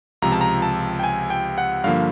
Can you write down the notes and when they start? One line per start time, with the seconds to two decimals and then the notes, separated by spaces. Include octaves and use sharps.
0.22 C#2 C3 F3 A#5
0.32 A5
0.41 A#5
0.62 A5
0.99 G5
1.04 G#5
1.30 G5
1.58 F#5
1.84 G2 D3 F3 A#3 F5